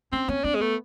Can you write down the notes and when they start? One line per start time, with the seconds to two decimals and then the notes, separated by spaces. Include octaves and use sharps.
0.13 C4 C#4
0.28 C4 C#4
0.44 C4 D4
0.55 G#3
0.61 A3 B3